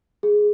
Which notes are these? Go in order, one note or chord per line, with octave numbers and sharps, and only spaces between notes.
G#4